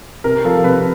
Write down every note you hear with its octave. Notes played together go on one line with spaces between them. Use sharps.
C3 A#4
F3 A4
C3 B4